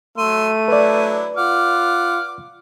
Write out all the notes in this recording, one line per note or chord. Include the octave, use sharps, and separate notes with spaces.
F#3 A3 C6 E6 D#7
F#3 D4 E4 B4 D5
F4 F#5 D6 F6